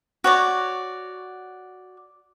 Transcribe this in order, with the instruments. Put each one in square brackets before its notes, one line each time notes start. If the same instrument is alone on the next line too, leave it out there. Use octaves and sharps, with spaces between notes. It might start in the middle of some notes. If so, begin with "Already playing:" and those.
[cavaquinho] F#4 C#5 D5